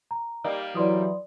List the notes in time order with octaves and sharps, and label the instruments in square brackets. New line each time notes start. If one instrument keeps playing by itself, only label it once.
[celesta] A#5
[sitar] G3 A#3 D#4
[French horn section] E3 F#3 [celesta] D5 C6 D#6